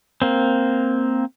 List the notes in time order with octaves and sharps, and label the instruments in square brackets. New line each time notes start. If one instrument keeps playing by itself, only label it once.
[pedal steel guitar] A#3 C4